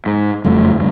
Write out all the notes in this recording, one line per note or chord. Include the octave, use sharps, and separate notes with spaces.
G#2
F#1 F2 G3 A3
D2 G3